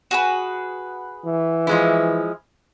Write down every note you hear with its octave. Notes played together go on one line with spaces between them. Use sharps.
F#4 G#4 B4
E3
F3 G#3 E4